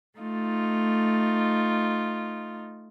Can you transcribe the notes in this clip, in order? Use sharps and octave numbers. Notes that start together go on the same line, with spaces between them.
A3 D#4 F4